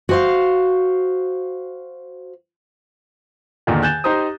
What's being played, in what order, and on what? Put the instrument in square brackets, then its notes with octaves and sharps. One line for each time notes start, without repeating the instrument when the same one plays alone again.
[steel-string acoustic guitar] F#4 C5 F5
[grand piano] E2 A#2 D3 D#3
G#5 F#6 G6 A6 E7
D#4 G4 C5 A#5 D#6